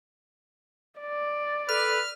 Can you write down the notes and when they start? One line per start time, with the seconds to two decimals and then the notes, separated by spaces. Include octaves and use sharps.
1.00 D5
1.69 A4 B4 F6